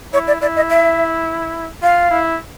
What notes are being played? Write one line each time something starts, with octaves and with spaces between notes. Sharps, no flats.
E4 C#5
D5
E4 D5
D#5
E5
F4 F5
E4